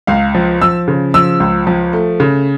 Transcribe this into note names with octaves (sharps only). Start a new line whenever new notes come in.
C#2 F5
F3
F3 E6
C#3
F3 E6
C#2
F3
A3
C#3